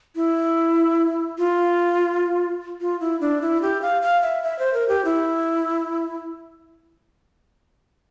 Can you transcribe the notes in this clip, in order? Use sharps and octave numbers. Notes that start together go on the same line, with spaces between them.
E4
F4
F4
E4
D4
E4
G4
F5
F5
E5
E5
C5
A#4
G4
E4